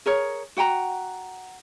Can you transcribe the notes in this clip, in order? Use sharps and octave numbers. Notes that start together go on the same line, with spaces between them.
G#4 A#4 C#5
F#4 F#5 G5 A#5